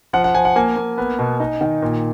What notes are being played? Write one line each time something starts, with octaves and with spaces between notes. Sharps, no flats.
F3 F#5
F#5
F3 G#5
F#5
A#3 G#5
A#3
B3
B2
D#4
D#3
A#2